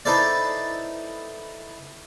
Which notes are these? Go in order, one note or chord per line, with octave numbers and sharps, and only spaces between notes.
D#4 E4 A4 B4 C5 D5